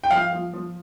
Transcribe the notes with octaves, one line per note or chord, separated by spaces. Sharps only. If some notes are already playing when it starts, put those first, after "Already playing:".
G5
F3 F5
F3
F3